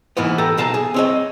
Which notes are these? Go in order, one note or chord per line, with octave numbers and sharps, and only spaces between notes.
G#2 E3 A#3 B3
G4 A4 A#5
B1 F5 A5 A#5
G#4
C4 C#5 D#5